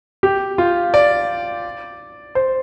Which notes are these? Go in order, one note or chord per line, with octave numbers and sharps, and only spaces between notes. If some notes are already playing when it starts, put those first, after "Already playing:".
G4
F4
D5
C5